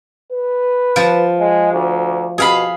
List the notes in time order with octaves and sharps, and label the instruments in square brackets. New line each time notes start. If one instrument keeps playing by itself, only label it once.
[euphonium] B4
[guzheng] F3
[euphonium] G#3
D2
[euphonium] B2 [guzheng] G#4 F5 B5